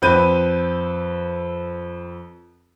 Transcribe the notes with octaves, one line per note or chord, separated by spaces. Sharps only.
F2 C4 B4 G6 D#7